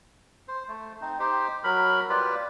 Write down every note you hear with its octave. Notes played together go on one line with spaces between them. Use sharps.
C5
A3
C4 D#4
D#4 G4 C5
F#3 A#4 B5
G3 F4 G4 B4